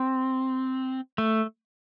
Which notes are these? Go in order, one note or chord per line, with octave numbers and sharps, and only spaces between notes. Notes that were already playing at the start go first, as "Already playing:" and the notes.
Already playing: C4
A3